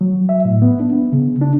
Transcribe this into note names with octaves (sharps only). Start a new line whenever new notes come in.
F#3
E5
A2
B3
D4
B3
C#3
D4